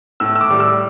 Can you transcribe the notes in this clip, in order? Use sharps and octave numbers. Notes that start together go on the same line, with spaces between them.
A2 E6
E6
D6
G3
E6